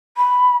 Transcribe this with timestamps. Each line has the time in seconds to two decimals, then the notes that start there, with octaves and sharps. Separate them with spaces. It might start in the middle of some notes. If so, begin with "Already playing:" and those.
0.17 B5